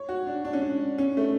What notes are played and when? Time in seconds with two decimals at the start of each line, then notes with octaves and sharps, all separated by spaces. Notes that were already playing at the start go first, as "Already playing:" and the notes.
Already playing: C#5
0.09 F#4
0.27 D4
0.45 D4
0.53 C#4
0.61 D4
0.98 C#4
1.17 A3